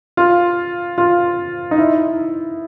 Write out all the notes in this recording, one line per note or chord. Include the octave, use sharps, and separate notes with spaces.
F4
F4
D#4
E4